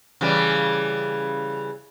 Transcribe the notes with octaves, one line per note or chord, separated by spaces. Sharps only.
C#3 E3 G3